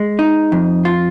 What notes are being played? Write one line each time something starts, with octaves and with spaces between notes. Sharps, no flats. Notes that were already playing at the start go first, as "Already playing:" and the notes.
Already playing: G#3
D#4
F2
F4